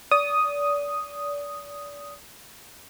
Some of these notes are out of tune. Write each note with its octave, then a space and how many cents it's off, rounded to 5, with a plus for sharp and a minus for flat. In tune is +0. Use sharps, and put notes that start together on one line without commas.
D5 -30 D#6 +0